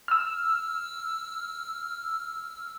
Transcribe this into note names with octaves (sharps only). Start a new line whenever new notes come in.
E6 F6